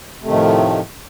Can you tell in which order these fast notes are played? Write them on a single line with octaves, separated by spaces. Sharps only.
C3 A3 D#3 A2 F3